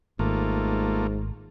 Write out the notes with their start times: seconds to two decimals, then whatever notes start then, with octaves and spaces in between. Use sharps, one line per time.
0.19 G#1 G#2 A3 A#3 F4